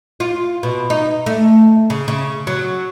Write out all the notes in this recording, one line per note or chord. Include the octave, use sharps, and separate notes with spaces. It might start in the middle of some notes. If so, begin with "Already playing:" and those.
F4
B2
D#4
A3
C#3
C#3
F#3